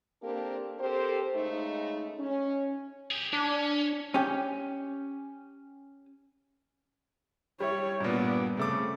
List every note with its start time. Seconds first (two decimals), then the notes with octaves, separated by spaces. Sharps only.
0.22 A#3 C4 D4 G4 A4 A#4
0.79 C4 G4 A4 A#4 C5
1.34 C#3 G#3 A3 D#4
2.18 C#4
3.11 G4 G#4
3.33 C#4 D4
4.14 C#4 G4
7.60 G3 E4 C#5
8.00 G2 A#2 B3 D5
8.57 C#3 A3 C4 D6